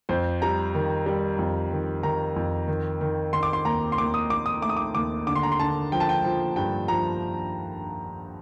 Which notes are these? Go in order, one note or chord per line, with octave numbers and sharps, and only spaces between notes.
F2 C5
G3 A#5
D#3
G3
F2
D#3
D#3 A#5
F2
D#3
D#3
D#3 C6
D6
C6
D#2 A#5
C6
D#2 D6
D#6
D#2 D6
D#6
A3 D6
D#6
D6
D#2 D6
D3 D6
C6
A#5
C6
D3 A5
F3 G5
A5
G5
F3
G2 G5
F3 A#5